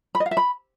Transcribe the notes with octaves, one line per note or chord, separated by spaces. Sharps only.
B5
D#5
F5
E5
B5